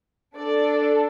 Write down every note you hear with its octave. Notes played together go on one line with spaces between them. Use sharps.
D4 A4 D5